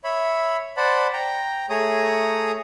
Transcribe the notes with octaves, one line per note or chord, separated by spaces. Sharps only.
C#5 E5 B5
C5 D5 F#5 A5 B5
G5 A#5
A3 G#4 C#5 A#5 D#6